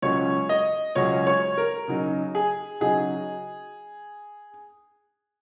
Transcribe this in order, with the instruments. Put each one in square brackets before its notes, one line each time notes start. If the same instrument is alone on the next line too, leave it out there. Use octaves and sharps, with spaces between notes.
[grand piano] C#2 C#3 F#3 C#4 [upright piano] C#5
[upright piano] D#5
[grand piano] C#2 C#3 F#3 C#4 [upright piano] C#5
[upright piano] C#5
A#4
[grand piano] C#3 F#3 D#4 F#4 D#5
[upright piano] G#4
[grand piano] C#3 F#3 D#4 F#4 D#5 [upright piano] G#4